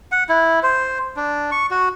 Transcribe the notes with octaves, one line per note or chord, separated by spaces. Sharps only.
F#5
E4
C5
D4
C#6
F#4